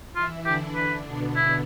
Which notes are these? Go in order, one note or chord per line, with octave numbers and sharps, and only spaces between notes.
E3 E4 F4
D3 D4 G4
B4
B2 B3
E4